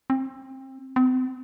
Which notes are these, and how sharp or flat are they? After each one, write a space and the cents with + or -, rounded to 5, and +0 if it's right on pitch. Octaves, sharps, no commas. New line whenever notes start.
C4 +25
C4 -40